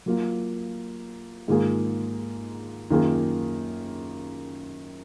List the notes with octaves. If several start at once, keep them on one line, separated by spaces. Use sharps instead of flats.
F#3 A#3 F4
G#2 D#3 A#3 F4 G#4
F#2 D#3 A#3 F4 G#4